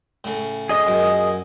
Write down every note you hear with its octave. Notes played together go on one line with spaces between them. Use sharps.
A2 C#3
G#4 D#5 D#6
F#2 A#2